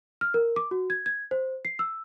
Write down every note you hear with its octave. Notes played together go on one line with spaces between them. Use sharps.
F6
A#4
D6
F#4
G#6
G#6
C5
C7
E6